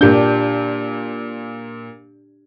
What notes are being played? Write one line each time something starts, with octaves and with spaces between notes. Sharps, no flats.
A#2 A#3 D4 G4 G6